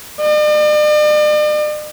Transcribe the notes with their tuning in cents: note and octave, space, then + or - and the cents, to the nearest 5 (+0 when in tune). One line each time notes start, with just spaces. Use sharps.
D5 +45